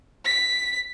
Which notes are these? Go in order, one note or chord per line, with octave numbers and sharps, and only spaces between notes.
B6